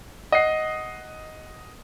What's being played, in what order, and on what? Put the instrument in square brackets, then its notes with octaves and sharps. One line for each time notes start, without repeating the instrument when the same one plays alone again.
[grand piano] D#5 F#5 C7